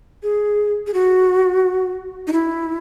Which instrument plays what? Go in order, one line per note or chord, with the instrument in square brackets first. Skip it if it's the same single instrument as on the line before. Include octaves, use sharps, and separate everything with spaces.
[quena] G#4
G#4
F#4
D#4
E4